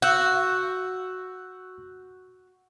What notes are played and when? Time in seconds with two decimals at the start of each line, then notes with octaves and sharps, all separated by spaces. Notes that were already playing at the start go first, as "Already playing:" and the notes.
0.02 F#4 E6 F#6 G6